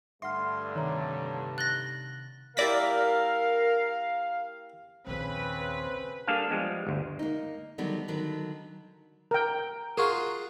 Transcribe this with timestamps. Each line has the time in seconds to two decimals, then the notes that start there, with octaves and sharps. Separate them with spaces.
0.22 G2 D3 A3 E5 F#5 C6 F6
0.76 C3 D#3 C#5 E5 A#5
1.58 F#6 A6 A#6 F#7 G7
2.57 A#3 E4 G4 A#4 D5 F5 A#6 B6
5.07 A#1 D#2 C#3 C4 B4
6.27 G3 A#3 D4 G#4 A4 F5
6.50 F3 G3 G#3 B3
6.87 G1 D2
7.19 A#3 D#4
7.78 D3 D#3 F#3 G3 B3 D#4
8.08 D3 D#3 F#3 B4
9.31 A#4 G5 A#5
9.98 F4 F#4 G#4 A#4